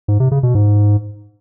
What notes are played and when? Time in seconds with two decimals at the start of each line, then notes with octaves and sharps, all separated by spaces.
0.08 G#2
0.20 C3
0.32 C#3
0.43 B2
0.55 G#2